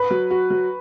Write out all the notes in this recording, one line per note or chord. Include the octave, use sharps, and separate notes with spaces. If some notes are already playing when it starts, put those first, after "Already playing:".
Already playing: B4
F#3
F#4
F#3